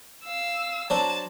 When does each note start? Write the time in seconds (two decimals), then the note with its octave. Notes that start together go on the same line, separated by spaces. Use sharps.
0.24 F5 E6
0.90 F#3 D4 C5 A5